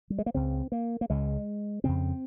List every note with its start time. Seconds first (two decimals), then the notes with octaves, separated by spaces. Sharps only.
0.10 G3
0.18 G#3
0.26 A#3
0.34 C#2 C#3 C4
0.72 A#3
1.01 A#3
1.10 C#2 C#3 G#3
1.84 F2 C#3 C4